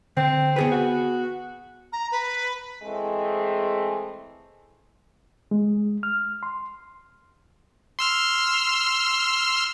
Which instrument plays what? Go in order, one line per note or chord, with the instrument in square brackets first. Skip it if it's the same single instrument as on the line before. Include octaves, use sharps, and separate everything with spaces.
[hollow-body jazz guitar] D3 [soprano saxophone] C4
[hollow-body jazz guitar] B3 G#4 B4
[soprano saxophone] F#4
[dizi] A#5
B4
[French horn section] E3 G#3 A3 C4 G#4
[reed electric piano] G#3
F6
C6
[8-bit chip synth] C6 E6 F6